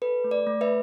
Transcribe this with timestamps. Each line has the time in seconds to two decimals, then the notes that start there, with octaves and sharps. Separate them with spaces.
0.02 A4 B4
0.24 A3
0.31 D5
0.47 A3
0.61 B4 E5